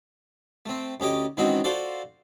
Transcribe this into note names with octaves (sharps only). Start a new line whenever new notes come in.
A3 C4
D2 C#4 G4 D#5 D6
G#2 D#3 E3 C4 C#4 F#4
F4 F#4 A4 C5 D5